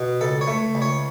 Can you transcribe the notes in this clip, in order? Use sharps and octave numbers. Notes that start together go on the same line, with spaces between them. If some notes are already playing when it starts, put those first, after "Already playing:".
Already playing: B2
C#2 A4
C#5
A3
C#2
C#5